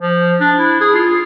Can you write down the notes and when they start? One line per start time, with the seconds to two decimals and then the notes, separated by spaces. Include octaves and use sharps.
0.01 F3
0.40 D4
0.59 E4
0.81 G#4
0.95 F4